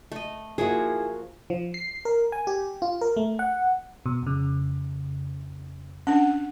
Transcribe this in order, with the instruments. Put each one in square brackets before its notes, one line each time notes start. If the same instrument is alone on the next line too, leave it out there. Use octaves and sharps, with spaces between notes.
[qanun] A3 D#5
[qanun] F3 A#3 F#4 [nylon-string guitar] E4 G#4
[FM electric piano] F3
C7
A#4
G#5
G4
F4
A#4
A3
F#5
B2
F2 C#3
[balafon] C#4 D4 [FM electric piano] F#5